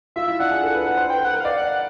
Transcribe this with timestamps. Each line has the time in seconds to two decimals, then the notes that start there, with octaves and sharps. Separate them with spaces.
0.16 F4 E5
0.28 E4
0.39 D4 F#5
0.51 G#4
0.63 A4
0.74 B4
0.86 B4
0.97 C5
1.10 G5
1.21 B4 F#5
1.33 A#4
1.40 D5 F5
1.57 F#5